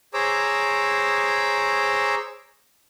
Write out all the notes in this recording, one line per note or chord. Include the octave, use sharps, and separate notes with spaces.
G#4 C5 C#5 A#5 D6 E6